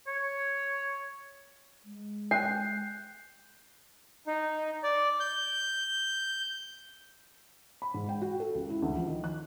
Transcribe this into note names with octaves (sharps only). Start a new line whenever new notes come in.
C#5
G#3
G#5 F#6 G6 C7
D#4
D5
G6
B5
G#2
G5
F#4
A4
C#2
E4
D2
F3
D#3
F#6